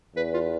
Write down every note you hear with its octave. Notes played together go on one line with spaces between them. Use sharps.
E2 B4
F4